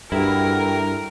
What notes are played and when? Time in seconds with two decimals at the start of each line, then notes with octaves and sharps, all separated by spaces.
0.12 G2 E4 F#4 A4 A#4 G5